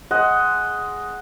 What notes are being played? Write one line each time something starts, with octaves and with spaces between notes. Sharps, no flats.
G#3 D#5 F#5